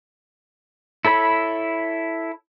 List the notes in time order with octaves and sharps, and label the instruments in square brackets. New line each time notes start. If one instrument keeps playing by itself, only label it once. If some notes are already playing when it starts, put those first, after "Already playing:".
[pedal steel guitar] E4 A4 C#5 B5